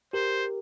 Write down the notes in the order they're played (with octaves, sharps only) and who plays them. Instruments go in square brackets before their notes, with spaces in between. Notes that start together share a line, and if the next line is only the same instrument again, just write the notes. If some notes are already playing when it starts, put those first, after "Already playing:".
[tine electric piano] G4 A#4 [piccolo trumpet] C5